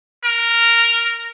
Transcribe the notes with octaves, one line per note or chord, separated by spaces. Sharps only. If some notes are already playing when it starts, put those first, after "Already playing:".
A#4